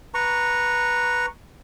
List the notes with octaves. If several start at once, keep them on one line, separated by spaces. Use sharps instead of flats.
B4 A#5 C#6